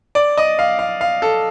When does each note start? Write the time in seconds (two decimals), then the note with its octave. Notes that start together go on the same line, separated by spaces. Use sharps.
0.15 D5
0.38 D#5
0.59 F5
0.79 F5
1.01 F5
1.22 A4